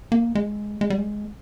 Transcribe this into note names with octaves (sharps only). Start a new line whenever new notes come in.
A#3
G#3
G#3
G3
G#3